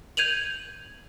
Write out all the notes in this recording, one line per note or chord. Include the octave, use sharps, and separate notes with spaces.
G6 G#6 D#7 F7 F#7